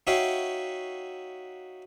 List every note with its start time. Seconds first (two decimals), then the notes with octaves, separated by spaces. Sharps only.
0.07 D#4 F#4 C#5 E5 F5 G5